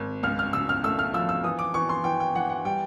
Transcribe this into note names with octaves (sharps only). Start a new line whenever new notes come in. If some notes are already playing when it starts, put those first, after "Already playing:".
Already playing: G#1
C#2 F6
F6
C#3 E6
F6
A3 E6
F6
F3 E6
E6
E3 D#6
D6
E3 C#6
C6
E3 G5
G5
E3 F#5
F#5
G3 G5